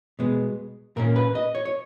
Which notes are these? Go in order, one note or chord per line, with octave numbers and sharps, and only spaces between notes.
B2 G#3 B3
A#2 A#3 C#4 A#4
B4
D#5
C#5
C#5